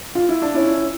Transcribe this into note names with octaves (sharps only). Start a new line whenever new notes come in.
F4
E4
D4
C#4 E4